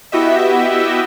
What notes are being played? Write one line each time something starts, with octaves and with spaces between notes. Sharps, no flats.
B3 E4 F#4 G4 D#5 E5